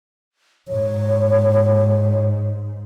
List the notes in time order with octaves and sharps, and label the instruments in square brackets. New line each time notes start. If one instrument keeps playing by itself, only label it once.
[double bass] G#2 [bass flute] C#5